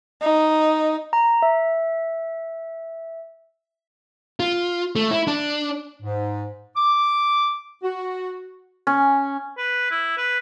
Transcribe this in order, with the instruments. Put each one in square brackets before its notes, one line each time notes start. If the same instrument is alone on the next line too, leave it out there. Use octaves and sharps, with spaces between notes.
[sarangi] D#4
[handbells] A#5
E5
[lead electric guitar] F4
A3
E4
D4
[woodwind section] G#2
D6
F#4
[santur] C#4
[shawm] B4
E4
B4